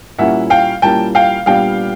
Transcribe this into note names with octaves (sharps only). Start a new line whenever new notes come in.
A#2 G3 A#3 C#4 E4 E5 F#5
F5 G5
A#2 G3 A#3 C#4 E4 G5 A5
F5 G5
A#2 G3 B3 D4 F5 G5